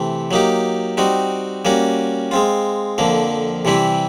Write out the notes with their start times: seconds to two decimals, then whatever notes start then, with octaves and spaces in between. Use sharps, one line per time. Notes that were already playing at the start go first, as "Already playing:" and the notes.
Already playing: C3 E3 A3 C4
0.31 F#3 A#3 D#4 G4
0.97 G3 C4 D#4 F#4
1.65 G3 A#3 C#4 F#4
2.31 G#3 C4 F4
2.98 F2 D3 F3 A#3
3.65 C3 E3 G3 C4 E4